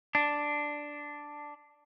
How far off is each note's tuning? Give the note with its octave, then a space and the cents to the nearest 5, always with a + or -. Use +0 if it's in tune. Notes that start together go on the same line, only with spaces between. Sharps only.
D4 +0